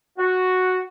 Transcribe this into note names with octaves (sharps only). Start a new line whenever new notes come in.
F#4